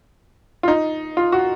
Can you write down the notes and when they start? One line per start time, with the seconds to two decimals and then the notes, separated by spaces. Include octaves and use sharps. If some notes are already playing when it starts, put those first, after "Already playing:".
0.63 F4
0.68 D#4
1.17 F4
1.32 F#4